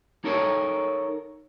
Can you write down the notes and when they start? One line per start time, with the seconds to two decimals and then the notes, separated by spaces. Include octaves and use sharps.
0.24 D#4 A4 A#4 C#5